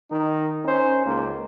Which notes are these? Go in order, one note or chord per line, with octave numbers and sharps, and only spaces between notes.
D#3 D#4
C#4 D#4 C5
C#2 A#3